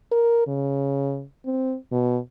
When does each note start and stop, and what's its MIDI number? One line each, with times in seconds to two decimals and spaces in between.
0.12 0.43 70
0.47 1.23 49
1.45 1.75 60
1.92 2.18 47